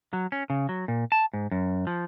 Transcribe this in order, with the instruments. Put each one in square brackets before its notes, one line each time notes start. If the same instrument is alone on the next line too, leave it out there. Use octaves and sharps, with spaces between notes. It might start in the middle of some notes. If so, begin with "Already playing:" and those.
[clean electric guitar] F#3
C#4
C#3
F#3
A#2
A5
G#2
F#2
F3